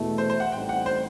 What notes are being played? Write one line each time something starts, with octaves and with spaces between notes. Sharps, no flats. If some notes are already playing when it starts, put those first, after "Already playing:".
Already playing: E2 B2 A3 E4
C5
C5
F#5
A1 A2 G3 C4 D#4 G5
F#5
C5